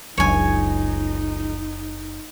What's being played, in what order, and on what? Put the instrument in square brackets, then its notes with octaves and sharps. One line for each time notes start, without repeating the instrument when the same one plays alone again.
[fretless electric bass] F#1 F#3 D4 [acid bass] C#2 [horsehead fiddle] D#4 [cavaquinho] C#5 G#5